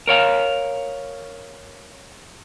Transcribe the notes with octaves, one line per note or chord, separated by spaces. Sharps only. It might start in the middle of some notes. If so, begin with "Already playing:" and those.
A#4 C#5 F5 A#5